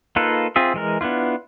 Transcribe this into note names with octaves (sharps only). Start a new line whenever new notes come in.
A#3 D#4 F4 A4 B4
C4 F4 G#4 E5
E3 G#3 A#4
B3 D4 E4 F4